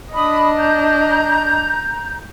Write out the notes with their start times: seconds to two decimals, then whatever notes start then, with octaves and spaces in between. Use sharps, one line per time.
0.14 D4 D#5 B5 D#6
0.58 A#5 G6